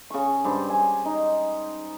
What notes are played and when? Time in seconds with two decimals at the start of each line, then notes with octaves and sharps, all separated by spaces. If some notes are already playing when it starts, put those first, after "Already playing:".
0.10 C#3 C#6
0.44 G2 C5
0.70 G#5
1.05 D#4